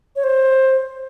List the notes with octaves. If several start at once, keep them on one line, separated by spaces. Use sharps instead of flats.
C#5
C5